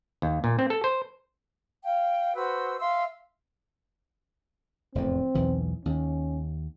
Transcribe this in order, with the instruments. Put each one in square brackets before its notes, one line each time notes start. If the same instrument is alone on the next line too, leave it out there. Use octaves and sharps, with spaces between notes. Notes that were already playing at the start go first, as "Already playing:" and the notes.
[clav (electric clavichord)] D#2
A#2
C4
A4
C5
[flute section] F5 G5
F#4 B4 C5 E6
E5 F5 C6 E6
[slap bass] F1 E2 A2 [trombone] C4
[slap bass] B1 E2 E3
[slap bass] D#2 [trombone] C#4